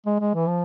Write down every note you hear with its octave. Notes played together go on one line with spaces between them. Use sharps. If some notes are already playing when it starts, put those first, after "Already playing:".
G#3
G#3
E3
F3